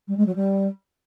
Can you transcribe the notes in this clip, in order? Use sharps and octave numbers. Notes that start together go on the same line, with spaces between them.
G3
G#3
F#3
G3